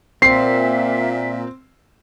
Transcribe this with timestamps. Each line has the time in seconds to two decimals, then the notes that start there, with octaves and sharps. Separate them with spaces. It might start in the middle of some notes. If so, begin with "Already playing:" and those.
0.22 A#2 C4 E5 C7